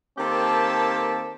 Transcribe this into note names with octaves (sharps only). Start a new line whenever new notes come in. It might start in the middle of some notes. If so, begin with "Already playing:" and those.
D#3 A#3 C4 G4 A4 A5